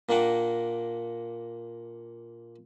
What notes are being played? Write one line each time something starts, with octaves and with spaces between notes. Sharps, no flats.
A#2 A#3 D4 F#5 G5